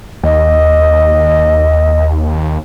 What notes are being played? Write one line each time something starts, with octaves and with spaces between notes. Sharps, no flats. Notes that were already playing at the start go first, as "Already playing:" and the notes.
D#2 D#5